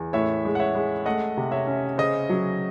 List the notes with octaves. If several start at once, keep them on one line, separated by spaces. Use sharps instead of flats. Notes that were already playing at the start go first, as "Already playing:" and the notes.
Already playing: E2
A2 C#5 E5
G#3
F#5
C#5 E5
G#3
A3 D#5 F#5
C3
C#5 E5
C#4
C#3 C5 D#5
F#3